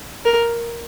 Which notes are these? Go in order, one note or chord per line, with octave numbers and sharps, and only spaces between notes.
A#4